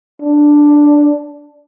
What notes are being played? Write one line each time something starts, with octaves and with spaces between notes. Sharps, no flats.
D4